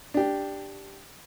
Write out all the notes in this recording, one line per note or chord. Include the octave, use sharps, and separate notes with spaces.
D4 G4